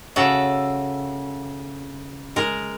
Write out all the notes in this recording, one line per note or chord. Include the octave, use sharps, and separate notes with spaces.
C#3 F#4 A4 E5
G#3 A#4